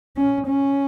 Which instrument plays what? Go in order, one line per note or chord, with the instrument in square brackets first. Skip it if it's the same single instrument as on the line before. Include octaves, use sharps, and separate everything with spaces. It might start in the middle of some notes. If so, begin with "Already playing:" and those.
[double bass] C#4
C#4